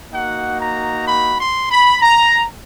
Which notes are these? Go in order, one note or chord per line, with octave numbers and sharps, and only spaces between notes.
A#3 D#4 F#4 F#5
A#5
B5
C6
B5
A#5